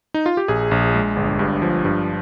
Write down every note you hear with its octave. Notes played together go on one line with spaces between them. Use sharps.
D#4
F4
G4
A#1 G#4
A#1
G#3
G1
G2
F3
G2